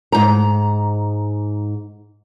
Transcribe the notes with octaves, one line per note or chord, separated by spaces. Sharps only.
G#2 A#5